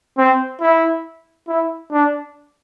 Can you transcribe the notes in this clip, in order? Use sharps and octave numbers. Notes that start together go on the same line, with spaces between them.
C4
E4
E4
D4